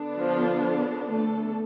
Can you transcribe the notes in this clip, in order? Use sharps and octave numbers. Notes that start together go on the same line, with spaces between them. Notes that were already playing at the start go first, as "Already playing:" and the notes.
Already playing: D3 B3 D4
F3 F4
A3 A4